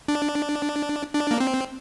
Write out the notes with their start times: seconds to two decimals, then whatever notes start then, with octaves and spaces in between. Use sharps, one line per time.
0.08 D4
1.14 D4
1.31 A#3
1.40 C4